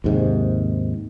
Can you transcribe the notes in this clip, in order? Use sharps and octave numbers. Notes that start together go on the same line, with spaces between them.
D#2 G#2 C3